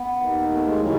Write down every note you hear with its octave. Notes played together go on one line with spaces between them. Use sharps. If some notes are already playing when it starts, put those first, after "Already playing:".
Already playing: B3
D#2 D#3
A3
G#3
C#3 E3 F#3